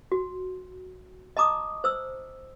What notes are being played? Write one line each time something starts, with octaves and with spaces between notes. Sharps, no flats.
F#4
D#5 A5 A#5 D6 D#6
C5 E6